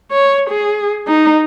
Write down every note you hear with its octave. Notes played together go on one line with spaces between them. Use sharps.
C#5
G#4
D#4